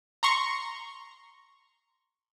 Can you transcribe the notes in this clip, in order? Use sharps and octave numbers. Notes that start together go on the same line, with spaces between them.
A#5 C6 C#6